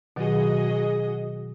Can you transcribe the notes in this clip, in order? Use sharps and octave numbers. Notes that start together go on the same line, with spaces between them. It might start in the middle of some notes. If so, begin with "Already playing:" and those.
B2 D#3 F#3 F#4 G#4 D#5